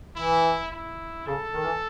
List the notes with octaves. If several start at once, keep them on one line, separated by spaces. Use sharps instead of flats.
E3 E4
E4
C#3 A4
D#3
E3